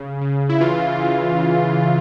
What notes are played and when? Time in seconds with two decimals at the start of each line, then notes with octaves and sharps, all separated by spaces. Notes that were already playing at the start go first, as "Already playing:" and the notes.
Already playing: C#3
0.21 C#3
0.49 E4
0.61 E3 F4
1.00 E3